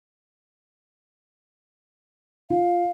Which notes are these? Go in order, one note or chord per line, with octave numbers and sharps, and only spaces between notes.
F4 F5